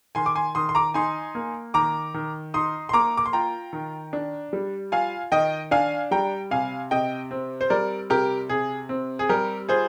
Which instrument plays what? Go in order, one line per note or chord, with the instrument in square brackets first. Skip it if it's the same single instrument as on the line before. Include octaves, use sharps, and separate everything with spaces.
[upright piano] D#3 G#5 C6
D6
G#5 C6
D#3 C6 D#6
C6
A#5 D6
D#4 G#5 C6
A#3
D#3 A#5 D6
D#3
D#4 C6 D#6
C6
A#3 A#5 D6
D6
C6
F4 G5 A#5
D#3
D4
G3
F4 F5 G#5
D#3 D#5 G5
D4 F5 G#5
G3 G5 A#5
C3 F5 G#5
C3 D#5 G5
C4
C5
G3 A#4 D5
C3 G4 A#4
C3 G#4
C4
G#4
G3 G4 A#4
F4 G#4 C5